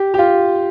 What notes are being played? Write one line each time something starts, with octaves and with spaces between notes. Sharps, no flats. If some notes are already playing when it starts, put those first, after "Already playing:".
Already playing: G4
G4
F4